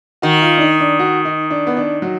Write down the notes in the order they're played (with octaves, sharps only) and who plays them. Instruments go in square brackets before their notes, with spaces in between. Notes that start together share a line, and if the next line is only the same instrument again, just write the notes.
[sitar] D#3 [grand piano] F#4
[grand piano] F4
D4
D#4
D4
F#4
D#4
D4
B3
D4
F#3